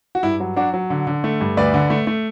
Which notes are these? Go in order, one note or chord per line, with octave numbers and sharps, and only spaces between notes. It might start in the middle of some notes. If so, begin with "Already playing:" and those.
F#4
G2 E4
F#3
F#3 D4 F#4
F#3
D3
D3
A3
G2
D2 B4 D5
D3
A3
A3